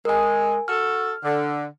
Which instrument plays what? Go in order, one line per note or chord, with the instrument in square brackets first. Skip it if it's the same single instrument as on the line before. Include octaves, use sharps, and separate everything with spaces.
[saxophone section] G#3 [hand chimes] A#4 G#5
[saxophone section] F#4 A4 [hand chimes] F6
[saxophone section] D3